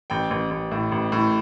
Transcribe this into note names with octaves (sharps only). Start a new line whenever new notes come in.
A1 G5
A1
A1
A2
A1
A2